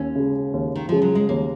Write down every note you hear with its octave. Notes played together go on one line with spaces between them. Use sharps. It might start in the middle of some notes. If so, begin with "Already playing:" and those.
Already playing: D#2 C#4
C#3 G#3
D#2
D#3
C#3 F3 G#3
F#3
G#3
D#2 A#3